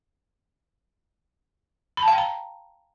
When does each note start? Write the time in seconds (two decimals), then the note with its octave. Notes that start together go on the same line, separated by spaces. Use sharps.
1.97 B5
2.03 A5
2.08 F5
2.13 G5
2.18 A#5